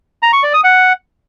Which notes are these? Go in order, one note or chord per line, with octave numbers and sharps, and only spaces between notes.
A#5
C#6
D5
D#6
F#5